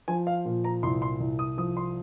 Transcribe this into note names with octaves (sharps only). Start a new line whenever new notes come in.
F3 G#5
F5
A#2
A#5
C2 C6
C6
C2
D#6
F3 D#6
C6